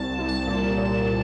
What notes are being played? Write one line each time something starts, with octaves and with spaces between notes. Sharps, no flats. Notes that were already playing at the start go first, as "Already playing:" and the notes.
Already playing: C2 A5
C2
A5
A#2
A#2